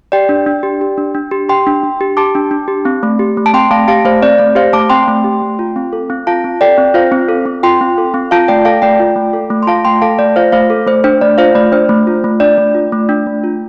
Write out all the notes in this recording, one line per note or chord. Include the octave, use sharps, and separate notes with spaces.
G4 D5 G5
D4
D4
G4
G4
D4
D4
G4
G4 G5 C6
D4
D4
G4
G4 A5 D6
D4
D4
G4
C4
A3
G4
A3
A5
C4 G5 C6
A3 F5 A5
G4 F5 A5
A3 C5 F5
C4 D5
A3 D5
G4 C5 F5
A3 A5 D6
C4 G5 C6
A3
G4
A3
F4
C4
A4
C4
F4 F5 A5
C4
A4 D5 G5
C4
F4 C5 F5
C4
A4
C4
F4 G5 C6
C4
A4
C4
F4 F5 A5
A3 D5 G5
A4 F5 A5
A3 D5 G5
F4
A3
A4
A3
C6
F4 F5 A5
A3 G5 C6
A4 F5 A5
A3 D5
F4 C5 F5
A3 C5 F5
A4
A3 C5
D4 C5
A3 D5
F4 C5 F5
A3 D5
D4 C5
A3
F4
A3
D4 D5
A3
F4
A3
D4
A3
F4